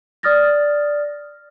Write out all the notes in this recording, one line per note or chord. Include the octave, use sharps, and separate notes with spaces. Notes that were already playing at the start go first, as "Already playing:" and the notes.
D5 D#6 F6 A6 A#6